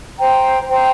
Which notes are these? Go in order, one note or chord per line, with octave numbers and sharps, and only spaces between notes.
C5 G5 A#5
C5 G5 A#5